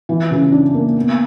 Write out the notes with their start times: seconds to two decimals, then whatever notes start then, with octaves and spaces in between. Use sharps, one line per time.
0.09 E3
0.31 C#3
0.52 D4
0.74 A#3
0.96 B3